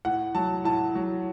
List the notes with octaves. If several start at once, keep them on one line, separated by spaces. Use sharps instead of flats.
A2 F#5
F#3 A5
A2 A5
F#3